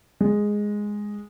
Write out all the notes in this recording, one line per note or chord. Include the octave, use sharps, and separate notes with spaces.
G#3